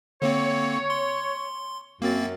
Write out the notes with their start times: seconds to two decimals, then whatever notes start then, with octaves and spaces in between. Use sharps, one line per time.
0.22 D3 A#3 C4 C#5
0.90 C6
2.02 F#2 A#3 C4 A6